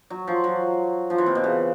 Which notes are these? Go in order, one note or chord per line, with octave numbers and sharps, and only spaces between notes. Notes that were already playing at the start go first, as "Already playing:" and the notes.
F#3
F3
F#3
F3
E3
C3
B2
C#3